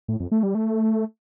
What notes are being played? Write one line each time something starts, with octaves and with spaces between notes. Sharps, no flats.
A2
F2
A3
G3
A3